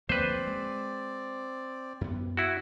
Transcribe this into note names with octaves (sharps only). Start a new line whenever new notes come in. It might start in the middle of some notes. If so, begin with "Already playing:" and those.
D2 F3 A#3 C4 B4 C5 D5
G#3
F#2 B3
E4 F#4